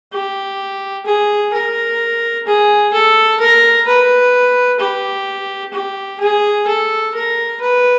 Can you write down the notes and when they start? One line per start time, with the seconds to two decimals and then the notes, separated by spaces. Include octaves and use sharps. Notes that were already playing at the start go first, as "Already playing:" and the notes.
0.12 G4
1.05 G#4
1.53 A#4
2.47 G#4
2.93 A4
3.40 A#4
3.87 B4
4.79 G4
5.73 G4
6.20 G#4
6.67 A4
7.14 A#4
7.60 B4